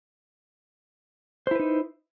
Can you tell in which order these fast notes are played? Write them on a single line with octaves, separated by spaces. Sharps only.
C5 E4 B4 D#4